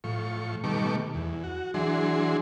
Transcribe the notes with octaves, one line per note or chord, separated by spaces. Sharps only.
A2 F3 C#6
B2 D#3 G3 A3 C#6 D6
E2
F#4
E3 F#3 D4 G#4 C6